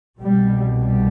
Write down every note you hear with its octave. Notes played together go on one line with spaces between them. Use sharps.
C2 B2 G3
G3